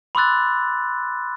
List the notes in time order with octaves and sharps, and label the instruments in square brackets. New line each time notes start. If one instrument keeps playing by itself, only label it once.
[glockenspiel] B5 C6 D6 E6 F#6 A6